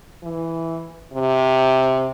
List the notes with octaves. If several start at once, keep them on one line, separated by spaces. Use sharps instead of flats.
E3
C3